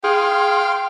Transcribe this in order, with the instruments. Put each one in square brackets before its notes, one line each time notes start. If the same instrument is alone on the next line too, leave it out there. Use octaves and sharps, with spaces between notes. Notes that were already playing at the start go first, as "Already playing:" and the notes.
[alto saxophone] G#4 [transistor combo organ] F5 C6 [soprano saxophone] G5